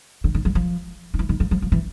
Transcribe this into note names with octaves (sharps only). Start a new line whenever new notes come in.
D3
D#3
F3
F3
D#3
E3
D#3
F3
F3
F3
E3